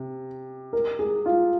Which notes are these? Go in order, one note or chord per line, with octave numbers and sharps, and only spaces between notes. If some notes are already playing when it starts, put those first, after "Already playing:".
Already playing: C3
A#4
G#4
F4